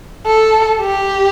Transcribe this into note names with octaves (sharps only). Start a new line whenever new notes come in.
A4
G4